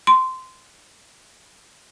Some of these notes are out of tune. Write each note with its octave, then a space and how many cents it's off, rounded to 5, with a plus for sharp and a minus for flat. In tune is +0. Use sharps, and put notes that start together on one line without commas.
C6 -15